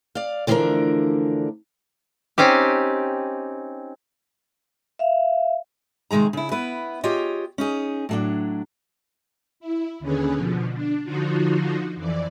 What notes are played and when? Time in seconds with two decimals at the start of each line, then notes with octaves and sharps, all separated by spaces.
0.15 D5 F5
0.47 D3 E3 F3 A3 D4 A#4
2.38 C4 C#4 D#4 G4
4.99 E5 F5
6.11 C3 D#3 G#3 G#4 A#5
6.33 C#3 E4
6.52 B3 E4 B4
7.04 F4 G4 G#4 C#5 D#5
7.58 C#4 D#4 G#4
8.09 A2 F#3 D4
9.60 E4
10.00 D#2 D3 C#4 G#4 B4
10.34 B2 D3 F3
10.74 D4
11.04 D3 F3 D#4 F4 F#4
11.96 F2 E3 D5